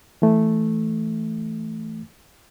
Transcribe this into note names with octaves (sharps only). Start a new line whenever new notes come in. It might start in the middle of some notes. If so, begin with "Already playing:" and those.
E3 A3